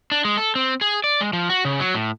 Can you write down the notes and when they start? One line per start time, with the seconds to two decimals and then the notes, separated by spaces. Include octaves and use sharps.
0.12 D4
0.25 G#3
0.37 A4
0.55 C4
0.81 G#4
1.04 D5
1.21 G#3
1.33 F3
1.50 F#4
1.65 C#3
1.80 F#3
1.95 A2